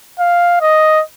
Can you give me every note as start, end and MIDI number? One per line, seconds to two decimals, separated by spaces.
0.20 0.58 77
0.61 1.02 75